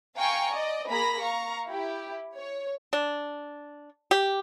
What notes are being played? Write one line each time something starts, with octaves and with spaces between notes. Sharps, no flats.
F5 G5 G#5 A#5 C#6 C#7
D5 D#5
A#3 G#4 A#5 B5 A#6 B6
F5 A#5 C#6
E4 G4
C#5
D4
G4